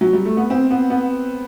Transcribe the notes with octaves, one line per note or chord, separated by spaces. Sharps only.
F#3
G3
A3
B3
C4
B3
B3